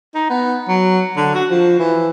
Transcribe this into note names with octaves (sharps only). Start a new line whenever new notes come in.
D#4
B3
F#3
D3
F#4
F3
E3